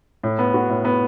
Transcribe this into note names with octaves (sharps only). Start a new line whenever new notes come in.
A2
B3
F#4
A2
B3